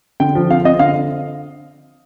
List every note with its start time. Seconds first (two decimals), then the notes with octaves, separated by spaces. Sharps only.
0.20 D3 G5
0.35 F3
0.50 C4 F5
0.64 C4 D#5
0.79 D3 F5